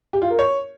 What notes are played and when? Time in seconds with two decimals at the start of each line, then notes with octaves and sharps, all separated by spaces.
0.13 G4
0.22 F4
0.30 A#4
0.39 C#5